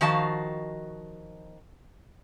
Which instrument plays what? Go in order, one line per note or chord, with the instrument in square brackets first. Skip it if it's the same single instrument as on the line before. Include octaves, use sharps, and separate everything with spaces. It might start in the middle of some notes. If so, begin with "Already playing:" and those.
[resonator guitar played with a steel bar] D#3 F3 F#4 D#5 F5 A5